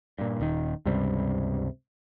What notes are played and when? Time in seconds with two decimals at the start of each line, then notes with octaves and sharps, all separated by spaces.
0.18 G2 A#2
0.40 D#1 D#3
0.85 C#2 G2 C3 G3